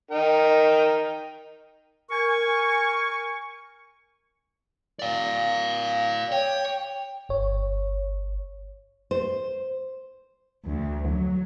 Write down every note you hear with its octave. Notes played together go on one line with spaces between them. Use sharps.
D#4 A#4 G5
A#4 G#5 C#6
D5 F5
C#5 G5
G1 C#5
C5
D2
F#3